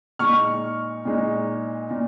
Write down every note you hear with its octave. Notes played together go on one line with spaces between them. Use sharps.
A#2 G#3 D#4 C#6 F6
A#2 G#3 D#4
A#2